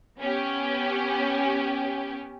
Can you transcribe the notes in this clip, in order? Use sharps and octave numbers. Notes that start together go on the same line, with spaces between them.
B3 C#4 G4